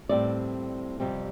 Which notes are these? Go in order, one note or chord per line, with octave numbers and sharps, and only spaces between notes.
A2 G3 C4 D5
F2 C3 G3 C4